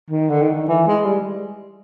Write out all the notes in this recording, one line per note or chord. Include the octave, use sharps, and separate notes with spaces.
D#3
D3
D#3
D#3
E3
G#3
G3